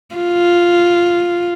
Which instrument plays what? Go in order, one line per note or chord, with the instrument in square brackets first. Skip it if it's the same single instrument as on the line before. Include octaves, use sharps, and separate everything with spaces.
[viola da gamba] F4